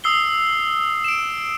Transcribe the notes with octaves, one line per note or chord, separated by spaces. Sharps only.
D#6 E6 C7 G7
D7 E7